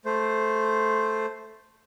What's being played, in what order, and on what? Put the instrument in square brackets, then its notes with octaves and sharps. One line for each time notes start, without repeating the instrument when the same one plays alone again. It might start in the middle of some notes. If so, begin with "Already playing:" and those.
[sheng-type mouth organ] A3 C5